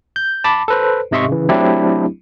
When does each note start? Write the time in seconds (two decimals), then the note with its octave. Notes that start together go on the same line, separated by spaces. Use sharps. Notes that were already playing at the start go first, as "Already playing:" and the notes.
0.16 G6
0.44 A5 B5 D6
0.68 A4 B4 C5
1.11 G#2 C3 D#5 E5 C6 C#6
1.28 C#3 E3
1.49 F#3 A3 C4 D4 E4 G4